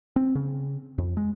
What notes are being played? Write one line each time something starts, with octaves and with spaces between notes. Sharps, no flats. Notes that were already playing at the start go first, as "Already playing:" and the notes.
C4
C#3
F2
G#3